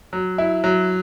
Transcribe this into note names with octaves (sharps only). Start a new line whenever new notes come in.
F#3
E4
F#3